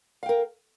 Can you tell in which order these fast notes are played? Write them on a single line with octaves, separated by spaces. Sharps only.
F5 G5 A#4